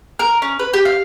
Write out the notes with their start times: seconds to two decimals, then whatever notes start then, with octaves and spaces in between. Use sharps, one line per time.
0.19 A#4
0.42 C#4
0.59 B4
0.73 G4
0.85 F5